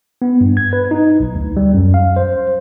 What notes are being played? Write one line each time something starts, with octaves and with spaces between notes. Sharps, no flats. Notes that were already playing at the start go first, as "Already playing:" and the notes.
B3
G2
G#6
B4
D#4
B1
D2
G3
F#2
F5
C5